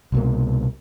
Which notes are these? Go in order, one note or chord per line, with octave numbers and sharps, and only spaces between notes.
C2 B2 A#3